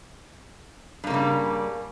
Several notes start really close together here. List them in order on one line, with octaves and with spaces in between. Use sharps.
G2 A#3 C#3 G3